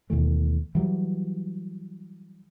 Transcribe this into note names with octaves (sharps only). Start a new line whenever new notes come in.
D#2 B2 E3 A3
E3 F#3 G3